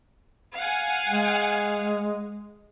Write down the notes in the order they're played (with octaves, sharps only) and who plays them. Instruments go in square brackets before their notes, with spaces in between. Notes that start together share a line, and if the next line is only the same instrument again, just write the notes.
[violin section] F5 F#5 G#5
[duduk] G#3